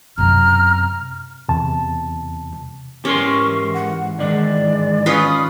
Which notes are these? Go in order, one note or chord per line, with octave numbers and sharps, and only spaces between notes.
F#2 C3 A#5 F6
E2 C3 A5
G#2 E3 C#4 G4 A#4 C6 C#6
F#5
G#2 D#3 E3 G#3 D4 D5
C#4 F4 B4 D#6